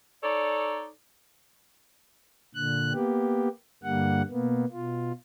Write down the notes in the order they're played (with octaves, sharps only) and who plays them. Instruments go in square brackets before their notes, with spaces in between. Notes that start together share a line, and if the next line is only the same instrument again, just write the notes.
[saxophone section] D#4 A4 C#5 D5
[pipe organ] A#2 D3 F#6
A#3 B3 G4
G2 D3 G3 A#3 F#5
B2 A#3 B3
B2 F4